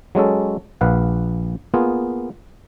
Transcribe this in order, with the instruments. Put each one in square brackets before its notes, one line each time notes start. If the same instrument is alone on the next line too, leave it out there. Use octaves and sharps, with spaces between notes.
[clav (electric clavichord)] F#3 G#3 C#4 A4
A#1 B4 F5 F#5
A#3 B3 F4 G#4